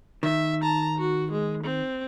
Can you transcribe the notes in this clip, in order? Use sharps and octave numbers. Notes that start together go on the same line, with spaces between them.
D#3 E5
A5 A#5
F#4
G#3
C4